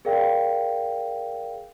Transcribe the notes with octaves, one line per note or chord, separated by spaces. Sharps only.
G#4 A#4 D5 F5 G5